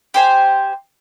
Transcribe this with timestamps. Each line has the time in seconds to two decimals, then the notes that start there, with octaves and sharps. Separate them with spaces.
0.14 G4 C5 G#5